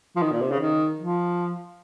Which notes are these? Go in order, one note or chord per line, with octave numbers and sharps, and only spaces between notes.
F3
D#3
A#2
C3
C#3
D#3
F3